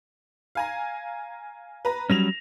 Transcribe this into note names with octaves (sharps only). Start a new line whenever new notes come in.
F5 G#5 A#5
B4 A#5
F#3 G3 C#4 A#6 E7 F7